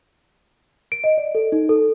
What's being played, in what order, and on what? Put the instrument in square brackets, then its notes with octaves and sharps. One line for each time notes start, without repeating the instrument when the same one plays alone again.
[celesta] D7
D#5
D5
A4
D#4
A4